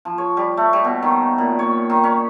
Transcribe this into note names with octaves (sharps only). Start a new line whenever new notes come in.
F3
C#5
G3
A3
G3
B2
D#3
A#2
C#5
D#3
C#4